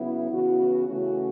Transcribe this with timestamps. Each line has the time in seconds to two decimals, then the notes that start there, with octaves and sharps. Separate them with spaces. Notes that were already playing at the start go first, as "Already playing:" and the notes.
Already playing: C#3 F#3 B3 E4
0.30 C#3 E3 B3 F#4
0.86 C#3 E3 A3 C#4 F#4